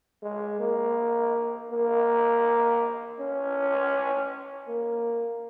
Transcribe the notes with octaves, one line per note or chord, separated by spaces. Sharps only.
G#3
A#3
A#3
C#4
A#3